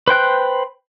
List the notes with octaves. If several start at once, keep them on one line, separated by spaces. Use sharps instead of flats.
B4 C5 G5 F#6